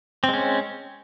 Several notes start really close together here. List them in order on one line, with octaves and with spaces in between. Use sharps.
C4 G#3 C#4